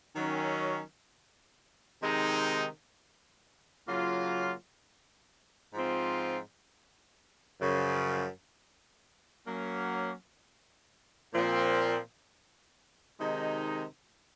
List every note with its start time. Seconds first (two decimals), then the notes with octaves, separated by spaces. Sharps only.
0.16 D#3 F#3 C#4
2.01 C3 D#3 G#3 C4 D#4
3.87 C#3 F#3 A#3 F4
5.74 G#2 F3 C4 F4
7.61 F#2 C#3 F3
9.47 F#3 A#3 C#4
11.33 A#2 F3 C4
13.19 C3 D#3 G#3 D#4